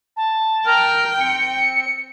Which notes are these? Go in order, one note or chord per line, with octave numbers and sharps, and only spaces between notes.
A5
A#4 G5 A#5 F6
C4 C#7